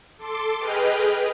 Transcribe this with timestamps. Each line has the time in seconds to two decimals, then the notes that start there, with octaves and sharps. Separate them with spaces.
0.19 A4 C6 D6
0.59 G#4 B4 D#5 G5 F6